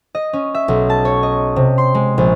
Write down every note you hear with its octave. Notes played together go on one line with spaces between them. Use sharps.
D#5
C#4
E5
B1
A5
C#5
D#5
C3
C6
G#3
A#1